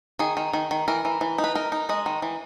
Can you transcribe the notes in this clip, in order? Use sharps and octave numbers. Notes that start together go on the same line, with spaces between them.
D#3 G#4
D#3
D#3
D#3
E3 A#4
E3
E3
D#4
B4
D#4 A#4
D#4
G#3 D#5
D#3
E3